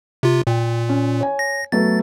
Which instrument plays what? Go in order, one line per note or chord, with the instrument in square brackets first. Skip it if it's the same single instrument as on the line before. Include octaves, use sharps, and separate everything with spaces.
[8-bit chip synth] C3 F4
[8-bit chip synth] A#2 [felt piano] G5
[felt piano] C#4
C#5 G#5
[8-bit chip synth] A#6
[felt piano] F#3 A3 B3 [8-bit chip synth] A6